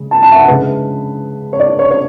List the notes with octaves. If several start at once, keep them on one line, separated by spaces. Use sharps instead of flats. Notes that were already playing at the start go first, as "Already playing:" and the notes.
Already playing: C#3 G#3
A5
A5
E5
F#5
C#3 G#3 B4
C#5
D5
C#5
C#5